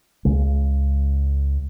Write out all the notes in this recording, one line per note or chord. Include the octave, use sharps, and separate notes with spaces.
C#2 C#3 G#3